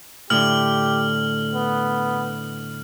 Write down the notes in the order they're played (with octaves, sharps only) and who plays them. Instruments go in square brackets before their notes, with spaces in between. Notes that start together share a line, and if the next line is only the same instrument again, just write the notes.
[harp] A2 D3 [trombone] G4 [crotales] F6 F#7
[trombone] B3